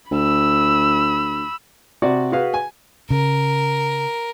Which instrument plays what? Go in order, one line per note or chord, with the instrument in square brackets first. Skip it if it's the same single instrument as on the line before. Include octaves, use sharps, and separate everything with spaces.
[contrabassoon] D2 [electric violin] B5 E6
[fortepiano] C3 F#4 D5
F#4 G#4 B4 F5
G#5
[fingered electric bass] C#3 [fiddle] A#4